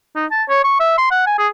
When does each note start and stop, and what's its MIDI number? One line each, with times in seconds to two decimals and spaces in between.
0.16 0.26 63
0.31 0.43 81
0.49 0.60 73
0.64 0.77 85
0.80 0.97 76
0.98 1.08 84
1.11 1.24 78
1.27 1.35 80
1.38 1.48 68